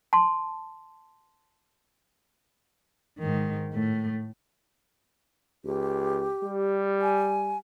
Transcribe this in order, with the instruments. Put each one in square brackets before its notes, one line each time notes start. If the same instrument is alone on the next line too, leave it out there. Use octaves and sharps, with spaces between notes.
[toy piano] A5 C6
[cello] G#2 D#3
A2 A3
[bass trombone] C#2 [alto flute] G4
[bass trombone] G3
[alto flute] G#5